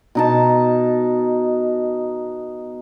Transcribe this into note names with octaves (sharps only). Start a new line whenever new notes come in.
B2 D#4 A5